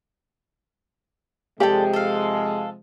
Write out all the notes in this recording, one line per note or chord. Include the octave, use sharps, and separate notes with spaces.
C3 F3 G#3 G4 A4 D5 G5
A4 F5